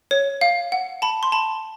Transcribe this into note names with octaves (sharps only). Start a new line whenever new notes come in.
C#5
F5
F#5
A5 B5
C6
A5 B5